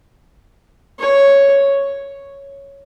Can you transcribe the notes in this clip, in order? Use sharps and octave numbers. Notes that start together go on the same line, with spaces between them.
C#5